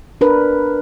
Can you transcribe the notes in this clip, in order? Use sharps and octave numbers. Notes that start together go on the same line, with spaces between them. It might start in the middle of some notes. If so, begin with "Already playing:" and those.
D4 A#4 B4